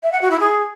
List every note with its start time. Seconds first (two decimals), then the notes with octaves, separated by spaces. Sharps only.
0.03 E5
0.12 F#5
0.21 F#4
0.30 E4
0.40 G#4